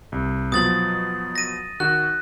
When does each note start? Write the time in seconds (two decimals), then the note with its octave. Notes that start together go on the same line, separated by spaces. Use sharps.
0.12 C2
0.52 B2 F3 F#3 D#6 A6 F#7
1.36 A#6 D#7
1.80 D#3 F#4 F#6